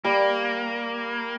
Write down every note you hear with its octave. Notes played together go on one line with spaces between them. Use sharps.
G3 A#3